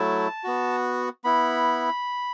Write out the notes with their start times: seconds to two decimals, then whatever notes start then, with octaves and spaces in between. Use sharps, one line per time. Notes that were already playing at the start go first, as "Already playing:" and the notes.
Already playing: F#3 A3 E4 A5
0.44 B3 F#4
1.24 B3 E4 B5